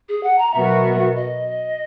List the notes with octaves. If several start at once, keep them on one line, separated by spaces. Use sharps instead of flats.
G#4
F#5
A#5
B2 F#3 B3 F#4 A#4 E5
D#5